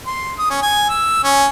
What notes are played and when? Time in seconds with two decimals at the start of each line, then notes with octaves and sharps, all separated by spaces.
0.07 C6
0.38 D#6
0.50 C#4
0.62 G#5
0.90 E6
1.24 C#4